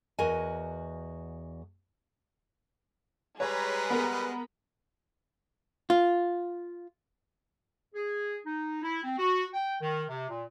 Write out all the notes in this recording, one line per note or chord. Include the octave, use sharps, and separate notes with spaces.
E2 F#4 A#4 D#5 G#5
G3 G#3 G#4 B4 C#5 A#5 B5
B3 A#4
F4
G#4
D#4
E4
C4
F#4
G5
D#3
C3
A#2